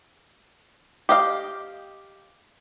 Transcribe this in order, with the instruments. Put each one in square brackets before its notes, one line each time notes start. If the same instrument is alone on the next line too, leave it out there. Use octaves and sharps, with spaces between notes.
[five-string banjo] G4 D#5 F5